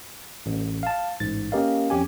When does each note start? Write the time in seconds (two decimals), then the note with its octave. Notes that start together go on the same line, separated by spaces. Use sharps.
0.46 A1
0.83 F5 A5
1.20 A1 G#2 A6
1.52 A#3 C#4 G4 A#4 D#5 F5
1.90 F2 C#4 G4 G#5